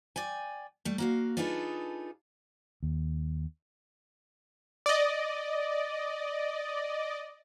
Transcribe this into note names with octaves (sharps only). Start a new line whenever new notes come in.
D5 G5 G#5
G3 A3
A#3 F#4 F5
D4 D#4 F4 G#4 A4 B4
D#2
D5 D#5